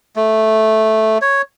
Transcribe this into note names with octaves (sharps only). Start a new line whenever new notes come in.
A3
C#5